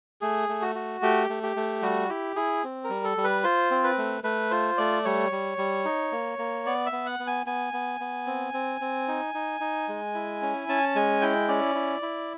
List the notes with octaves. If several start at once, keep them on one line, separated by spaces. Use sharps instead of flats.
A3 G#4
A3
F#4
F#4
A3 G4
A3
G4
A3
G3 F#4
E4 G4
E4 G#4
C4
A#4
G3
A4
G3
B4
F4 C5
C4
B4
A3
A3 B4
F4 C5
A3 D5
G3 C#5
G3
G3
D#4
A#3
A#3
B3 D5
E5
B3
F#5
B3
G#5
B3 G#5
B3
B3
C4
C4
C4
D#4
D#4
D#4
G#3
E4
C#4
C#4 A5
G#3 G#5
E4 G5
C#4 D5
E4
E4